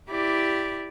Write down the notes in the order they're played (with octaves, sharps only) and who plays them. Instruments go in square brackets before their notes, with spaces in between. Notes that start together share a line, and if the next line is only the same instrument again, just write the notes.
[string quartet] E4 G4 D5 D6